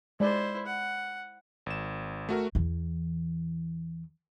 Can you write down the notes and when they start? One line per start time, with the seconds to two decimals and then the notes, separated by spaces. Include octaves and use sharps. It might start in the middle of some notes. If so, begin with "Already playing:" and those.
0.20 G#3 E4 C5 D5
0.66 F#5
1.66 G#1 E7
2.29 A3 F#4 A#4
2.55 E2 E3